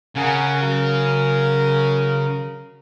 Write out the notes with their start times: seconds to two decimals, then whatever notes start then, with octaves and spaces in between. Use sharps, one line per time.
0.16 C#3 A#4 F#5 G#5
0.61 F#3 A#4